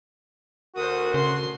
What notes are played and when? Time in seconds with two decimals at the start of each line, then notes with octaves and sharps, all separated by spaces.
0.76 D2 F#4 A#4 C5 D#6
1.14 C#3 C6